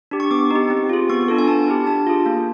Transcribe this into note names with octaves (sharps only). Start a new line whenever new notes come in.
D4 G4
C#6
B3 D6
D#4 G4
C4
F4 G#4
B3 C#6
D4 F4 A4
G#5
B3 A5
E4 G4
D4 A5
F4 G#4
A#3